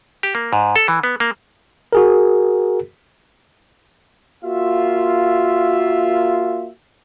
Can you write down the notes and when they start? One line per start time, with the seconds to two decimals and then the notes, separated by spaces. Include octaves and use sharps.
0.23 G4
0.35 A#3
0.53 G#2
0.76 A4
0.88 E3
1.03 B3
1.20 A#3
1.93 F#4 G#4 A#4
4.44 A#3 F4 F#4 E5